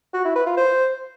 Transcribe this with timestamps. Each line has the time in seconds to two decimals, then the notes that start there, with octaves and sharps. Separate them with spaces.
0.14 F#4
0.24 E4
0.35 B4
0.46 F4
0.57 C5